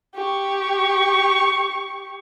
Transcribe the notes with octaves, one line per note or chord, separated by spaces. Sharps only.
G4 C#6